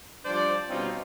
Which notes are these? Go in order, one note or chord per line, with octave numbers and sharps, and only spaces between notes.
F3 G3 D4 C5 D5
B2 G3 C4 C#4 D#4 F4